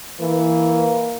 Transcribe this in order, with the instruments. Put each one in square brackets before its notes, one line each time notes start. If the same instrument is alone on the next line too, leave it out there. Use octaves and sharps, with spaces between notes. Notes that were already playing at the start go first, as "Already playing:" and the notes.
[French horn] E3 [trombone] A#3